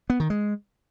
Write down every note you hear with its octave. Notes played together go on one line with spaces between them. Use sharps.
B3
D#3
G#3